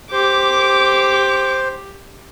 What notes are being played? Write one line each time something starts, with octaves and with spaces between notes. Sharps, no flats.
G4 C5 D6